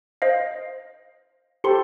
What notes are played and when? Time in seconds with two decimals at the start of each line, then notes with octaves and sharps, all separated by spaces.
0.22 C5 D#5 F5
1.64 G4 A4 C5 B5 C6 C#7